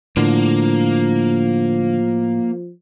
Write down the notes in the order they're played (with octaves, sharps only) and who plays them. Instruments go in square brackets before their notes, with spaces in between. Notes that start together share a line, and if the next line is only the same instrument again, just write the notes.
[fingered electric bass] A2 [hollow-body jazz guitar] D3 [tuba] F3 [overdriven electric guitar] A#3